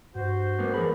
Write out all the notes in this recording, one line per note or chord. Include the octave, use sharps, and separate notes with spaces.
G2 F#4 C5
G2 A#3 B3
E2 G#4 A#4 B5